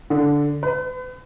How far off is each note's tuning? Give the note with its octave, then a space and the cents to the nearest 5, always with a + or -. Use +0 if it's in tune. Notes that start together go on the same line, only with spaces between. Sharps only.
D3 -10
B4 +40